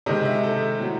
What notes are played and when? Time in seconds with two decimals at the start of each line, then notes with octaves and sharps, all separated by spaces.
0.06 C3 D#3 G#3 D#5
0.25 E5
0.43 A4
0.80 A2 F#3